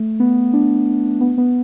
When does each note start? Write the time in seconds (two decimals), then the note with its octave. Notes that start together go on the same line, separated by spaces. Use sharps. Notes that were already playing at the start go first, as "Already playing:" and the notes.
Already playing: A3
0.20 B3
0.53 D4
1.21 B3
1.38 B3